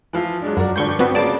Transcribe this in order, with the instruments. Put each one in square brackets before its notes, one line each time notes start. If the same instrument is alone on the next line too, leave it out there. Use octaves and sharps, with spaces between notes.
[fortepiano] E3 F3 F4
F#3 G#3 D4
[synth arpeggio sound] F#2 [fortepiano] F#4 A#4 D5
[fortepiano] G2 F3 [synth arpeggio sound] D3 C#6 G6
[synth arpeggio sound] B3 C4 F#4
[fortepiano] C#3 A#3 C#5 [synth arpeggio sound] D5 A5 D6